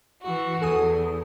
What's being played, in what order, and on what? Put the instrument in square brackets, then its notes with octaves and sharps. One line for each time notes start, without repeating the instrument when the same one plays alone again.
[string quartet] E3 F#4
[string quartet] E2 [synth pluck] A4 G#5 D#6